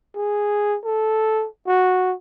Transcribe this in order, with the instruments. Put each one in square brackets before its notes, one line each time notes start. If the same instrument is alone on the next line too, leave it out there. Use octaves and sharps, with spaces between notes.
[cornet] G#4
A4
F#4